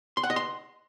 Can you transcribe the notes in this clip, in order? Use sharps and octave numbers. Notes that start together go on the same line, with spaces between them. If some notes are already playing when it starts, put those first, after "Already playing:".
C6
F#5
D#5
C6